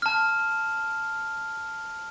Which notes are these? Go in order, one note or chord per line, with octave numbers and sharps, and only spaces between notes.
A5 F6